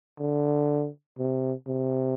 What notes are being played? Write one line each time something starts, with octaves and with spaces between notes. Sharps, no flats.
D3
C3
C3